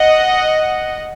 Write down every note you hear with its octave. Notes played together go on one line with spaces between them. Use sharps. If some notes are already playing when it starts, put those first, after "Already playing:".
Already playing: D#5 F#5